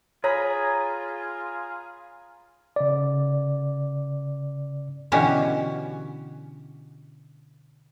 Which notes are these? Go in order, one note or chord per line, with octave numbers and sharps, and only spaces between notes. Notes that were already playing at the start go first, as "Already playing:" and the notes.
F4 G#4 C#5 A#5 B5
C#3 D5
B2 D3 E3 C#4 F#4 G4